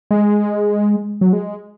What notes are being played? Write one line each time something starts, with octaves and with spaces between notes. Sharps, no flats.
G#3
F#3
G#3